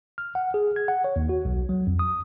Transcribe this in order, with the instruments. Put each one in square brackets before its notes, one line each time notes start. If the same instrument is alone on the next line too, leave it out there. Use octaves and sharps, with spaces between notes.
[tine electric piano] F6
F#5
G#4
G#6
F#5
C#5
D#2
F#4
B1
F#3
F2
D#6